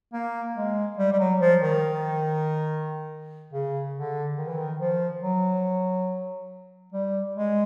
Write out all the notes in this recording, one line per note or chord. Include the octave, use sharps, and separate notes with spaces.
A#3
G#3
G3
G3
F#3
F3
D#3
C#3
D3
D#3
E3
D#3
F3
F#3
G3
G#3